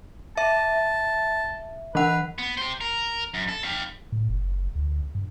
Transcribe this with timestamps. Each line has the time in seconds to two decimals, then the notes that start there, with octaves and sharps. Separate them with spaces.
0.37 E5 A5
1.95 E3 B4 F#5
2.38 B3
2.57 G4 C5
2.81 A#4
3.34 F#2
3.49 A4
3.64 G4 F5
4.12 A2
4.29 F#1
4.75 D2
5.15 G2